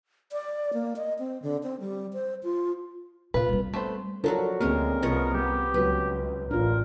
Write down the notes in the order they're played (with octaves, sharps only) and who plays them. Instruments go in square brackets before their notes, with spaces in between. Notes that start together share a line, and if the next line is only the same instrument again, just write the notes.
[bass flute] D5
A#3
D#5
C4
D3
C4
G3
C5
F4
[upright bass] A#2 [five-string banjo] F4 B4
[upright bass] G3 C4
[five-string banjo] A3 B3 C5
[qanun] F3 F#3 F#4 [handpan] D4 A4 A#4
[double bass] D2 [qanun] G#3 C#4 [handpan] A#3 C4 [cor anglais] A#4
[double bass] C2 B3 [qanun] F3 C#5 D#5
[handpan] G3 [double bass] B3 [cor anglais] G4
[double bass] C#2 [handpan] F#3 F#4 [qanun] B4
[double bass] A1 [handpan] D4 F4 [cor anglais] A#4